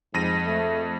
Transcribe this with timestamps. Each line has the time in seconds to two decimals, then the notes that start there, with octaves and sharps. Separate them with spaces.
0.14 F2 G#2 A#6 D#7
0.46 A3